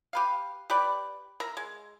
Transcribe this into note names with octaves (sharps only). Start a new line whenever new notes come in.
G4 B4 F5
G4 B4 D5
A#4 E5 A#5
G#3